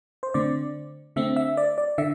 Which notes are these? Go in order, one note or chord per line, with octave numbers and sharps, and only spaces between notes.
C5
D3 A3 C4 D5
D3 A3 C4 E5
E5
D5
D5
D3 E5